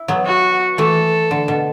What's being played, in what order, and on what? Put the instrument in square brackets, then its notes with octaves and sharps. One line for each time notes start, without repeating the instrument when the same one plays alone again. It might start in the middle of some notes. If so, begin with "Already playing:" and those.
Already playing: [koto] E4
F#3 B3
[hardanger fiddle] F#4
[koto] E3 A3 [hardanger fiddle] A4
[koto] D3
B2